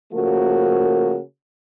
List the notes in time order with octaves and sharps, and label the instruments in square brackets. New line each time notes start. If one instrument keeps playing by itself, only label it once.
[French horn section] C#3 F3 A3 A#3 F#4 A#4